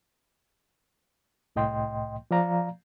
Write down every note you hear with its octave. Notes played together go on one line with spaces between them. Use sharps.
C2 A2 D#5 G5 C6
F3 D5 F5 A#5